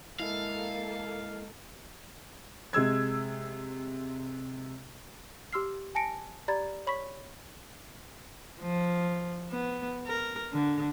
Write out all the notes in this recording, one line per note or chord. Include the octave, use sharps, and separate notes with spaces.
G#3 A#3 E4 A4 A#4 D#5 F5
C3 G#3 E6 G#6
G4 C6 E6 F6 C7
G#5 A5 A#6 C#7 D7
G4 D5 A#5 B5 G#6 A6
C#5 B5 C#6 B6
F3
B3
A#4
D3